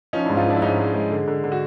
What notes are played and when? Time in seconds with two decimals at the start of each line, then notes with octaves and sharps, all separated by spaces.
0.13 F3 C#4 D#4
0.25 G#2 D4 E4
0.37 D#4 F4
0.46 F3 D4 E4
0.56 E4
0.62 G#2 C#4 D#4
0.78 G#3
0.94 G#3
1.11 D3
1.28 D3
1.44 D3
1.52 F#4